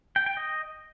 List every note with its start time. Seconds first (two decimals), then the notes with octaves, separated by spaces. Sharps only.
0.16 G5
0.26 G5
0.37 D#5